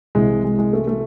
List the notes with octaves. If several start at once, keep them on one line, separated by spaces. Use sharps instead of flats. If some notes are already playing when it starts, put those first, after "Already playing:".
C2 C3 E3 G#3
G#3
G#3
A3
A3